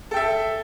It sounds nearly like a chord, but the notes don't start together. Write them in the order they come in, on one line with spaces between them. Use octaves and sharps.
A4 G5 E5